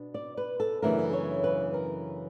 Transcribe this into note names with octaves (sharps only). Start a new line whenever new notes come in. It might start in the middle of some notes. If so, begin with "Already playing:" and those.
Already playing: B2 D4
D5
B4
A4
F#2 C#3 E3 A3 D4 A#4
C#5
B4
A#4